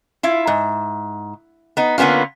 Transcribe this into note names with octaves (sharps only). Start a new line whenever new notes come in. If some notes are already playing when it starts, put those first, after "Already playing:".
E4 F4
G#2
B3 D#4
D3 A#3 B3 C#4 F4